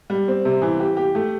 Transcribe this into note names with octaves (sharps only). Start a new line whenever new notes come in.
G3
C4
C3
E3
G4
G4
A3